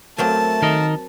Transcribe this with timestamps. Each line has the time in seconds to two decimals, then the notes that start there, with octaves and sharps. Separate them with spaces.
0.18 F#3 A3 A#3 C4 A5
0.62 D#3 A#4 D#5